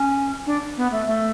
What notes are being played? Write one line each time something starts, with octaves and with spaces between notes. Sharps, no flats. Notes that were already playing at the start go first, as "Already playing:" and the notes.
Already playing: C#4
D4
B3
A3
A3